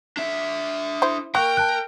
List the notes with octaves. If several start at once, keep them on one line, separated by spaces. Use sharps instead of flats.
D4 E5
E4 C5
A#3 A#4 G5 C#6 F#6
A5 F#6